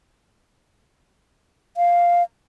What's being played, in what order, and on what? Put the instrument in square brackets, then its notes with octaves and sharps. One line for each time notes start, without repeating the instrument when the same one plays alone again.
[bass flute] F5